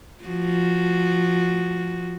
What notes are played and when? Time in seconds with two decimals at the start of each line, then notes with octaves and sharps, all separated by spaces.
0.24 F3 F#4